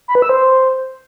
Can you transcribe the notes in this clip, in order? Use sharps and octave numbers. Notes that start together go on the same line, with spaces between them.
B5
B4
E6
C5